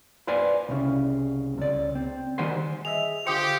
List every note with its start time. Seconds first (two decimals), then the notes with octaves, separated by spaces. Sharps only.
0.27 B4 C5 D5 F5 G#5
0.69 C2 C#3
1.58 C#2 D5
1.95 C4
2.38 D#3 G3 C5 F#5 G#5 C6
2.85 G#4 D#5 E5 F7
3.27 D3 F4 G4 C5 D#6 C#7